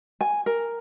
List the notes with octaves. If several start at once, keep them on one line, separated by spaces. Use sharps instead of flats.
G#5
A#4